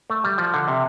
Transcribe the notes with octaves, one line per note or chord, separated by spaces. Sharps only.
A3
G3
F3
D3
C3